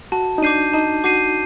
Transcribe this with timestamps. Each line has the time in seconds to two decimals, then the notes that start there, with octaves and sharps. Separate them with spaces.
0.12 F#4 A5
0.38 D#4
0.42 D4 D6 G6 C7 D#7
0.73 D#4 A5
1.04 F#4 D6 G6 C7 D#7